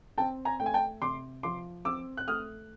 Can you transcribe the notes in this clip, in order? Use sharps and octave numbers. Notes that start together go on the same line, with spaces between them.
C4 G5 A5
G#5 A#5
A3 G5
G#5
G5 A5
C3 C6 D6
F3 C6 D6
C4 D6 E6
F#6
A3 D#6 F6